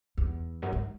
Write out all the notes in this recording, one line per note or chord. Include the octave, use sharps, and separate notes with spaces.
E2
F#2
G#2